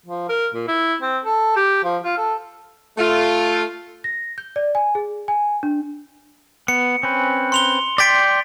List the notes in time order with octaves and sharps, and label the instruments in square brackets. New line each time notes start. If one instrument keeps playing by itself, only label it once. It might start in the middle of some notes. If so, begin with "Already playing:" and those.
[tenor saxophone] F3
A#4
A#2
E4
C4
A4
G4
F3
F4
A4
[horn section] A3 F4
[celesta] A#6
G6
D5
G#5
G#4
G#5
D4
[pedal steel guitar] B3 [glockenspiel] C#7
[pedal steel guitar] C4 C#4 B4
[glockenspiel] C6 F7 G7
[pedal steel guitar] D5 G5 C6 [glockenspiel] A6 B6 D7